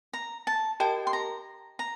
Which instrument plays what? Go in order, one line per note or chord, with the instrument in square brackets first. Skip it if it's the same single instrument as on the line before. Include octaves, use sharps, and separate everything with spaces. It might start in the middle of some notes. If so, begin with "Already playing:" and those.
[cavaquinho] A#5
A5
[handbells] G4 A#4 D#5 A5 [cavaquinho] G5
[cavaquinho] C6
A#5
A#5